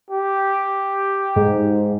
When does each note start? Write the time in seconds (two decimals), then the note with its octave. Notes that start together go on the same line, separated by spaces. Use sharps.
0.10 G4
1.36 G#2